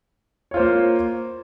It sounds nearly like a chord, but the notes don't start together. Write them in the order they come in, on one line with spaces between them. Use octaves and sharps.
C#5 F4 C5 A#3